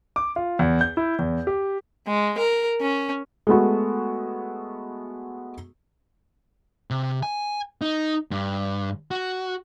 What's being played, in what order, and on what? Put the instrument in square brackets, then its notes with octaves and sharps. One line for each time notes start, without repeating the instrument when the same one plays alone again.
[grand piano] D6
F4
E2
G6
E4
E2
G4
[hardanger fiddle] G#3
A#4
C#4
[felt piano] G#3 A3 B3 F#4
[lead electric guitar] C3
G#5
D#4
G2
F#4